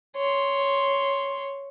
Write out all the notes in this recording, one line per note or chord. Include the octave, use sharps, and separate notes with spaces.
C#5 C6